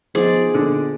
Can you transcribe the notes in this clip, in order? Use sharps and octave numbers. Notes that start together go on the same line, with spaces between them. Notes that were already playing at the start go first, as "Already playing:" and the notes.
F3 B3 D#4 G#4 C5 D5
A#2 D3